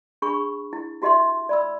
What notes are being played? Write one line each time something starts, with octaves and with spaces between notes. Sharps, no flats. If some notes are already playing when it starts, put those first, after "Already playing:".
D4 G#4 B5 C#6
E4
E4 F#4 G4 D#5 E5 C6
D5 B5 E6